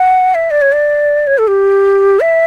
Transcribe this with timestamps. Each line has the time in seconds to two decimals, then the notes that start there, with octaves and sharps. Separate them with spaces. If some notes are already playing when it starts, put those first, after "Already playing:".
Already playing: F#5
0.35 E5
0.51 D5
0.62 C#5
0.72 D5
1.27 C#5
1.38 A4
1.48 G4
2.20 E5